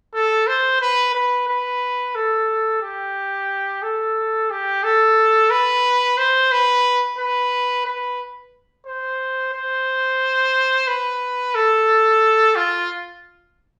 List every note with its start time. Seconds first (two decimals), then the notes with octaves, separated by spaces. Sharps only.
0.14 A4
0.47 C5
0.81 B4
1.14 B4
1.48 B4
2.15 A4
2.82 G4
3.83 A4
4.50 G4
4.83 A4
5.50 B4
6.18 C5
6.51 B4
7.18 B4
7.86 B4
8.86 C5
9.53 C5
10.88 B4
11.55 A4
12.56 F4